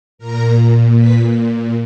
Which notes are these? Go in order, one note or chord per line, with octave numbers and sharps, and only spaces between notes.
A#2 A#4 A#5
B4 B5